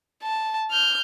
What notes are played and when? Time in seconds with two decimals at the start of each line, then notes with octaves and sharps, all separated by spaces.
0.23 A5
0.71 F6 G6